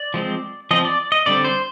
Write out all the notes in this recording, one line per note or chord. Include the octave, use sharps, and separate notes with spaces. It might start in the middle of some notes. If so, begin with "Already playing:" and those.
Already playing: D5
F3 G#3 C4
F3 C4 D#5
D5
D#5
D3 G3 C4 D5
C5